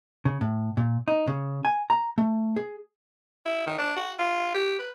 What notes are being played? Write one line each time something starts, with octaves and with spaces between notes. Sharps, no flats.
C#3
A2
A#2
D#4
C#3
G#5
A#5
A3
G#4
E4
D#3
D4
F#4
F4
G4
B4